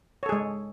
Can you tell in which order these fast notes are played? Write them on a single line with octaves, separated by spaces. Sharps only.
C#5 A4 G#4 G#3